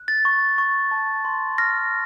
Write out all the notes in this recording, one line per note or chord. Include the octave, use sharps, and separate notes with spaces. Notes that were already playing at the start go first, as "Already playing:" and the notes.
Already playing: F#6
A6
C#6
C#6
A5
C6
F6 A#6